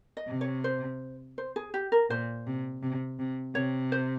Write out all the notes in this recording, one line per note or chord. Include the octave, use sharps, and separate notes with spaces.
D#5
C3
C#5
C5
C5
G#4
G4
A#4
A#2 C5
C3
C3
C3
C3 C#5
C5